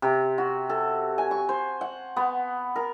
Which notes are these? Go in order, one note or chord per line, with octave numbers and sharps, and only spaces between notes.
C3
F#4
A4
G#5
C#6
C5
F#5
B3
A#4